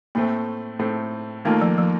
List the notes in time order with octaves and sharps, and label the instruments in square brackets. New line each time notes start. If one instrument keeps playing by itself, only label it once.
[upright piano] A2 A3 C4 [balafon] A#3
[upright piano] A2 A3 C4
[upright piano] D#2 D#3 A#3 F4 A4 [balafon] A3
[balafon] F3
F3